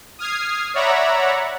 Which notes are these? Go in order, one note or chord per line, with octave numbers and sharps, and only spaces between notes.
D#6 F6 G#6 C7
C#5 D5 E5 F#5 A#5 B5